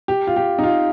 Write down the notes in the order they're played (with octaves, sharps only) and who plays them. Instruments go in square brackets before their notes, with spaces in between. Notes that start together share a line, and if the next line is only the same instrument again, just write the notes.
[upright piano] G4
F4
G4
D#4
F4